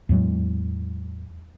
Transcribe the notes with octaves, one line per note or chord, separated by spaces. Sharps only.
E2 A2 F#3 G#3